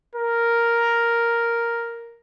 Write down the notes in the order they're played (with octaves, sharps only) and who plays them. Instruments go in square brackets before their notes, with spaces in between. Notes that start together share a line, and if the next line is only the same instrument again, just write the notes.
[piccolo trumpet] A#4